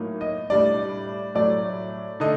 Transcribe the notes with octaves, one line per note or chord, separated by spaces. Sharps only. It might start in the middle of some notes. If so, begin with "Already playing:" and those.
Already playing: A2 F#3 A#3 D#4
D#5
A2 G3 D4 D5
A2 F#3 A3 D5
D3 A3 D#4 D#5